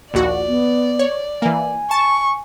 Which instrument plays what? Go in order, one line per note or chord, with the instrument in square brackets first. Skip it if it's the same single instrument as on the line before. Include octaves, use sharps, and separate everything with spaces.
[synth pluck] A#1 D#2 F#4 [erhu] D5
[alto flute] B3
[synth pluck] C#5
[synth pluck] E3 A#3 [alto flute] G#5
[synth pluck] A5 [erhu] C#6